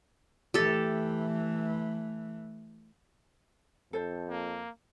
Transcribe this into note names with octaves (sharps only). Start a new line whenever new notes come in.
E3 A3 G4 A4
F2 A4 C5
A#3